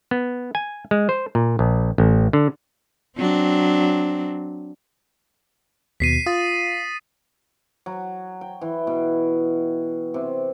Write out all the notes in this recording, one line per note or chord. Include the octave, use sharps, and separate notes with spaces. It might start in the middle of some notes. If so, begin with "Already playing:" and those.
B3
G#5
G#3
C5
A#2
A#1
A1
D3
F#3 C4 D4
D#2 B2 B6 C7 D#7
F4 D#6 A6
F#3
G5
E3
B2
C3